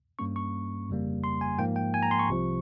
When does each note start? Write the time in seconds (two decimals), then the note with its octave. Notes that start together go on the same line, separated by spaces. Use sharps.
0.19 G2 G3 A#3 C#4 C#6
0.36 C#6
0.88 G1 F2 C#3 G3 A#3
1.24 C6
1.41 G#5
1.58 G#2 F3 A#3 G5
1.76 G5
1.94 G#5
2.03 A#5
2.11 C6
2.19 C#6
2.29 C2 C3 F3